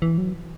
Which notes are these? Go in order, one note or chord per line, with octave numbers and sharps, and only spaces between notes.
E3
F#3